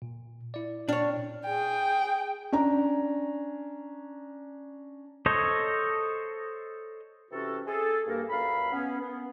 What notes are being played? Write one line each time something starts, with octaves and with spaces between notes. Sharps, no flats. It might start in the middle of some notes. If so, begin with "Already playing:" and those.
A#2
E4 D5
A#2 D4 C#5 G5 F6
G#4 G5
C#4 D4 A#5
A4 C5 C#5 D#5
C3 E3 C#4 F#4 A4
G#4 A4
G2 A#3 A#4
C#2 F#2 F5 B5
B3 C#4
B3